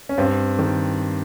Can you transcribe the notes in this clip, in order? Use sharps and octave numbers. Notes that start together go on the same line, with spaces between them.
C#4
G2 C4
D#3